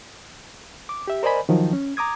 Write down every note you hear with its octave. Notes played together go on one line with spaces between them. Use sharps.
D6
G4 E5
A#4 C5 D5 D#5 G#5 B5
D#3 F3 F#3
C#4
A#5 D6 D#6 G#6